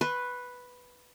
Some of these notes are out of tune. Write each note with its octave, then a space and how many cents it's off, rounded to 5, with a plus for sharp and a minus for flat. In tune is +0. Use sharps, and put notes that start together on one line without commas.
B4 +0 C6 +45